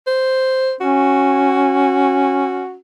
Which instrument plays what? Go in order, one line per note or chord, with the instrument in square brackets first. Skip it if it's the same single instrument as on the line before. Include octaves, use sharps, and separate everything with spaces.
[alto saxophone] C5
[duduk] C#4 [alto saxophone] F#4